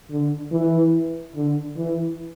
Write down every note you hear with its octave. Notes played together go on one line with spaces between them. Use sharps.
D3
E3
D3
E3